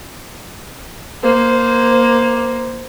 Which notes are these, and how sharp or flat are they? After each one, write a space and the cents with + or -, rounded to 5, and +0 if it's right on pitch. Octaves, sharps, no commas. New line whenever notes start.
A#3 +10 C5 -10